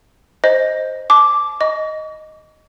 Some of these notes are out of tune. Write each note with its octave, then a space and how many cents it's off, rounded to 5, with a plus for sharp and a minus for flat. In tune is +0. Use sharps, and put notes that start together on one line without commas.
C5 +0 D#5 +0
A5 -30 D6 +0
D#5 +0 C#6 +45